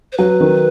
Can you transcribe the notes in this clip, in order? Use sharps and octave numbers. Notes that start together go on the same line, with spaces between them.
C5
F#3 B4
D#3